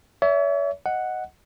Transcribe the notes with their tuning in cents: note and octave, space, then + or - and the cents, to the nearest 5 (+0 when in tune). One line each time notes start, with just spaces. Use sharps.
C#5 +40 E5 +0
D#5 +0 F#5 +0